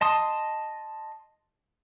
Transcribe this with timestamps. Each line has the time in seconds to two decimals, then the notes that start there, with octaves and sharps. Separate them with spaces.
0.01 D#5 A5 C6 D#6